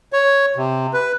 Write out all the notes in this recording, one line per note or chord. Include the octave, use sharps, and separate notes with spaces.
C#5
C3
B4